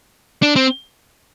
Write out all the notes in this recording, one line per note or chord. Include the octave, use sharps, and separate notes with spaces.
D4
C4